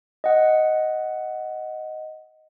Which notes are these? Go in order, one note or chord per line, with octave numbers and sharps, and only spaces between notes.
D#5 F#5